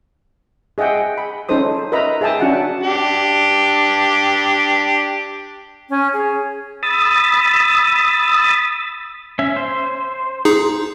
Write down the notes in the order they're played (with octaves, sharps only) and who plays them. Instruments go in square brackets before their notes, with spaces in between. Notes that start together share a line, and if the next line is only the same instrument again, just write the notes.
[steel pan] G#4 D#5 E5 F#5 G5
B5
C#4 D#4 A4 C5 D#6
A#4 B4 D#5 E5 A#5 B5
G#4 E5 G5 A5 D#6
C#4 D4 F#4 E5 F#5 A5
[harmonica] D4 G4
[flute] C#4
G#4
[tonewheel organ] B5 D#6 E6 A6
[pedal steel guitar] C#4 E5
C5
[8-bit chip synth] D#4 G#4